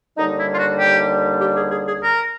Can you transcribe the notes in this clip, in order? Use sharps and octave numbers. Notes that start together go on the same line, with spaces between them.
D#2 D3 G3 D#4
E4
F4
F#4
G4
G4
G#4
G#4
G#4
A#4